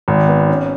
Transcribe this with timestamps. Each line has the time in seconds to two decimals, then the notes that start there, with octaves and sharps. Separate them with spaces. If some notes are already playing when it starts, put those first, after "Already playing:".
0.08 G#1
0.28 B3
0.49 C#4